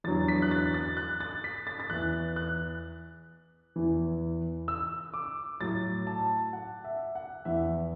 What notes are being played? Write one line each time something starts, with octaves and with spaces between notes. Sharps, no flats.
E2 D3 F#3 A6
B6
F#6
A6
A6
F#6
A6
B6
A6
A6
E2 E3 F#6
F#6
E2 E3
E6
D6
A2 F#3 A6
A5
F#5
E5
F#5
E2 E3 E5